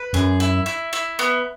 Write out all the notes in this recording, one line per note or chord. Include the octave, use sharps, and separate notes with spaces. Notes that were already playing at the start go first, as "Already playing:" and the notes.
Already playing: B4
F#2 G#4
E4
E4
E4
B3